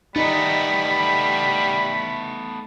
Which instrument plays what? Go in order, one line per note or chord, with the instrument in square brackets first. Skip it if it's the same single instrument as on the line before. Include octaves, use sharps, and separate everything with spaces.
[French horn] G3 [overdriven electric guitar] A3 B3 [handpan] D#4 [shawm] B5